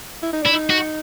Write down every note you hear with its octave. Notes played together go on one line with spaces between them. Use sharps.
E4
D#4
D4 E4
D#4
F#4